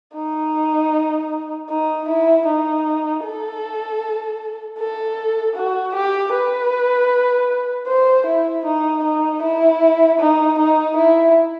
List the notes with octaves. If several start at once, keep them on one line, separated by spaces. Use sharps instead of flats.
D#4
D#4
E4
D#4
A4
A4
F#4
G4
B4
C5
E4
D#4
D#4
E4
D#4
D#4
E4